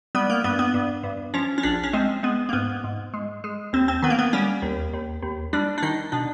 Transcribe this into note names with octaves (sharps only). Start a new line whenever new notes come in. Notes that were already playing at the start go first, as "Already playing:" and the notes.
G3 B3
A#3
G2 B3
B3
G2
G2
F3 C#4
C#4
A#1 D4
C#4
G#3 C4
G#3 B3
A#3
G#2 B3
G#2
G#3
G#3
D#2 C4
C4
D#3 B3
A#3
B3
G3 C#4
D#2
D#2
D#2
G3 D4
D4
D#3 D#4
B2 D4